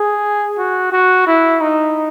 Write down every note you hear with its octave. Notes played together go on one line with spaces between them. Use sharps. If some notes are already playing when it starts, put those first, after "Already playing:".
Already playing: G#4
F#4
F#4
E4
D#4